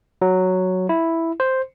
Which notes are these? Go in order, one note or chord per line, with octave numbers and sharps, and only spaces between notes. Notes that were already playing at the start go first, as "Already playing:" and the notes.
F#3
E4
C5